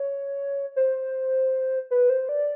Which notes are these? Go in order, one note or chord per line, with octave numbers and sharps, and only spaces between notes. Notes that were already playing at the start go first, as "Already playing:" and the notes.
Already playing: C#5
C5
B4
C5
D5